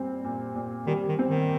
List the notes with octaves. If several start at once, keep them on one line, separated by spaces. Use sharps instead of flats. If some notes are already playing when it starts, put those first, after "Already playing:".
Already playing: A#2 G3 C4
A#2
A#2
D#3 G3
D#3
C4
D#3